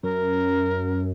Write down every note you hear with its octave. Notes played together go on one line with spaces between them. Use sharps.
F#2 A#4